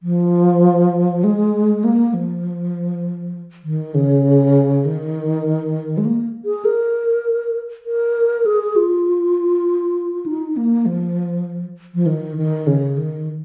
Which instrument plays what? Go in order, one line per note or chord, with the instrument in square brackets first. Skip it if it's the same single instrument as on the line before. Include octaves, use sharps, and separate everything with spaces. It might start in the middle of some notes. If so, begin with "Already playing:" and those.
[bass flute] F3
G#3
A#3
F3
D#3
C#3
D#3
G#3
A#3
G#4
A#4
A#4
G#4
F4
D#4
A#3
F3
F3
D#3
D#3
C#3
D#3